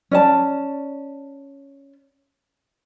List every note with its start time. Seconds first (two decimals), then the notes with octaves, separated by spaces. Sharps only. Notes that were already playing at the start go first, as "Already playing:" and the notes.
0.11 C#4 D5 A5